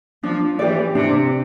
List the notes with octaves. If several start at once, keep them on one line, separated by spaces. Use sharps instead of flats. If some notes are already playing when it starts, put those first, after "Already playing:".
F3 D4
E3 G4 D5
C3 D4